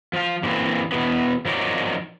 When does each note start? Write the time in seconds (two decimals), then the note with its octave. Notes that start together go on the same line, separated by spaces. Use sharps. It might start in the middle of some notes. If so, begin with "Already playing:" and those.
0.13 F3 F5
0.43 A#2 D3 E3 A3 A#3 C4
0.92 B2 E3 B3
1.45 F3 F#3 D#4 A#4 C#5 D5